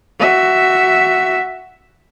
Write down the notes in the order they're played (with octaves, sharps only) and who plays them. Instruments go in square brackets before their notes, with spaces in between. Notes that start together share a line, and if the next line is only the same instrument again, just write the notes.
[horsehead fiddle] F#4 E5